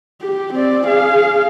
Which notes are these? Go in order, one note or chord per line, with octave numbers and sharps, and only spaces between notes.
G4
C4 D5
G#4 F5